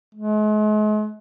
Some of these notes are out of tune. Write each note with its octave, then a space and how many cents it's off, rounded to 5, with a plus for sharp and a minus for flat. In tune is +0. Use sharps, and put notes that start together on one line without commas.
G#3 +40